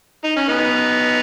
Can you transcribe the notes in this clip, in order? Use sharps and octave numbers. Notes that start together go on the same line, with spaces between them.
D#4
C#4
B3 D#4